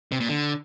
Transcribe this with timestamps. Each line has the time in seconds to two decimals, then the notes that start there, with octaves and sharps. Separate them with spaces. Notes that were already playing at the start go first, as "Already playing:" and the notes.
0.12 C3
0.20 A#2
0.28 D3